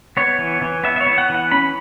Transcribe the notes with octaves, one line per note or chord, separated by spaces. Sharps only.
B3 C#5
E3
E3
B3 E5
E5
C#5
B3
F#5
E3
F#5
C#4 B5